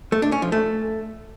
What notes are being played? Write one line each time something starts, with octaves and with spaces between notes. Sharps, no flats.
A3
D4
C#4
F3
A3